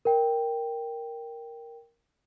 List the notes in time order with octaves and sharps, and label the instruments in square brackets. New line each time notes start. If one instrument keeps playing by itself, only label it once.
[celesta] A#4 G5